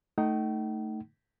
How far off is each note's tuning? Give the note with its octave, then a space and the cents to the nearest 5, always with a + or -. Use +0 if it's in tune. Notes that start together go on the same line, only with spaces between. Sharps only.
A3 +5 D#4 +0 G5 -45